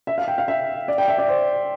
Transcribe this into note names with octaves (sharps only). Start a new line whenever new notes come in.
E5
F5
G5
F5
E5
D5
G5
E5
D5
C5